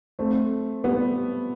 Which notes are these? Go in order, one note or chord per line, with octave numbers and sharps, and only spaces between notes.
A3 C4
G3 B3